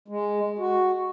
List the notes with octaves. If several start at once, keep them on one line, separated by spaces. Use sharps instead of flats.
G#3
F#4